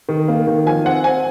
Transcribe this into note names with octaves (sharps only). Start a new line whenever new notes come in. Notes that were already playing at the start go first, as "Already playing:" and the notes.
D#3
A#3
D#3
F3 G#5
C4 F#5
C4 G#5